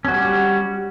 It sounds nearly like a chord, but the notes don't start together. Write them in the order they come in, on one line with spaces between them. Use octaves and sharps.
C#4 F#4 G3